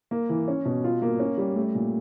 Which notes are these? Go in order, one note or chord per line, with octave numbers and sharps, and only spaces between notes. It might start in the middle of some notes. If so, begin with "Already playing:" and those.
A#3
E3
C#4
B2
F4
A#3
C#4
G3
A3
A#2